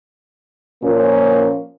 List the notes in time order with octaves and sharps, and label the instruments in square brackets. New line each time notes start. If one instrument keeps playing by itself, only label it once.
[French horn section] A#2 F3 A#3 C#4